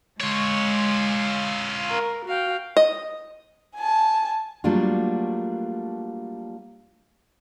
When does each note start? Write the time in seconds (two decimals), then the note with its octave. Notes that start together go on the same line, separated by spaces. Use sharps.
0.20 G#3 F4 C#5
1.91 A#4
2.26 F#4 F5 G5
2.77 D#5
3.77 G#5 A5
4.64 F#3 G3 A3 A#3 D4 F4